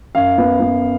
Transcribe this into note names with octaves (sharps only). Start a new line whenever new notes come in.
F#2 F5
B3
B3